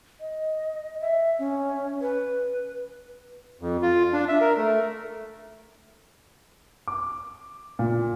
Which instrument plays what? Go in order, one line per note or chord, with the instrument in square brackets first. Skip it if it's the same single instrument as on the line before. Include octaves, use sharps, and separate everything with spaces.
[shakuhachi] D#5
E5
C#4
B4
[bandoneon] F2
F4
D4
E5
A#4
A3
[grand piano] D6
A#2